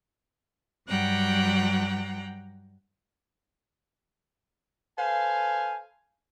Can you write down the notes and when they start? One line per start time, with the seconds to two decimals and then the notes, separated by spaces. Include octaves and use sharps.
0.88 G2 F#3 G3 F#5 G5 A#5
4.98 A4 B4 C5 F5 G#5